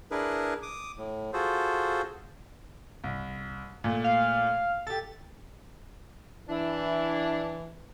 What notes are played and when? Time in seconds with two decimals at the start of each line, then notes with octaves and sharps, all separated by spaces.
0.11 D4 E4 G#4 A#4 B4
0.63 D6 D#6
0.98 A2
1.33 F4 F#4 G#4 A4 C5
3.04 C2
3.84 A#2 A3
4.04 F5
4.87 G4 A4 A6
6.49 E3 D4 E4